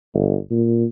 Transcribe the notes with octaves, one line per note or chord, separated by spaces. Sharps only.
G1
A#2